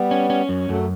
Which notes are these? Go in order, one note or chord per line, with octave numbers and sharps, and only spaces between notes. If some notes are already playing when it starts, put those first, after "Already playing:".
Already playing: G3 B3
C#4
C#4
F#2
F#2 F#3 A3